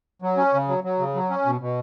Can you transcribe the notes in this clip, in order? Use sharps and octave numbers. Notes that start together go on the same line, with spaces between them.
F#3
C#4
C#3
F#3
F#3
C#3
F#3
C#4
B2
B2